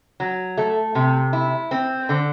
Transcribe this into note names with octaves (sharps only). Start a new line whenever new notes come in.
F#3
A3
C3
E4
C4
D3